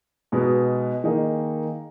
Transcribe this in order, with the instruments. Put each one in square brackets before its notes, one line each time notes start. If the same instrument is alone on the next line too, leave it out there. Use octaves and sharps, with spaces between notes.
[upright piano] B2 G#3 B3 D#4
D#3 A#3 D#4 G#4